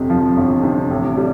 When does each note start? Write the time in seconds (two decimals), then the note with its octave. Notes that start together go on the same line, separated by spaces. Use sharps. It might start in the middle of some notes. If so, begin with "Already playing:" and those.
Already playing: G1 F2 C3
0.10 F3
0.37 G1
0.63 C3
0.91 A1
1.17 G3